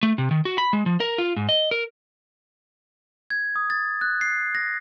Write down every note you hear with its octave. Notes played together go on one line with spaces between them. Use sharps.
A3
C3
D#3
F#4
B5
G#3
F3
A#4
F4
G#2
D#5
A#4
G#6
D#6
A6
F#6
C7
A#6